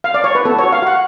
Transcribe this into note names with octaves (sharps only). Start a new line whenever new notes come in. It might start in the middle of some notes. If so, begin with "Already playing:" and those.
F5
D5
C#5
B4
B3 A4
F#4 C#5
F5
F#4 F#5